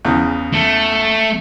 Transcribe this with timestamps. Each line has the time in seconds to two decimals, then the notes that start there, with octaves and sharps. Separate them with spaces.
0.05 E2 C#3
0.54 A3